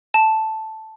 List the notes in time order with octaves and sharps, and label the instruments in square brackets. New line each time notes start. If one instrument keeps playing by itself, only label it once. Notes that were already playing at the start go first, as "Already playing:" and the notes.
[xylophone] A5